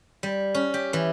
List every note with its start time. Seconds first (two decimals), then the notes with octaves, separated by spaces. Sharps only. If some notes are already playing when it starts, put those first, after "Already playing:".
0.23 G3
0.55 C#4
0.74 G4
0.93 E3